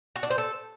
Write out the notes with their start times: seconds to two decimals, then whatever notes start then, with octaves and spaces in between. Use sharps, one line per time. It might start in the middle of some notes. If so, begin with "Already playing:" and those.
0.16 F#4
0.23 D4
0.30 C5
0.38 A4